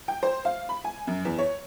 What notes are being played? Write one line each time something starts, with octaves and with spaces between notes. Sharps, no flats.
G5
C5
F5
B5
G#5
F#2
E2
C#5